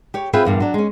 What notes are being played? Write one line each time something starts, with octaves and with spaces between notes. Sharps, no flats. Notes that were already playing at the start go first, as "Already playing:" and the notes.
G4 C#5
C4 F4 G#4 B4 E5 G5
E2 G2 A#2
F#3 D4
G#3 C#4